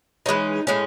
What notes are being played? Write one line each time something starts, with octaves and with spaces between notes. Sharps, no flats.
E3 G#3 C#4 D#4
A2 G#3 C#4